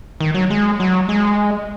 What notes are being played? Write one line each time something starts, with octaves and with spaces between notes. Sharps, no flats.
D#3
F#3
G#3
F#3
G#3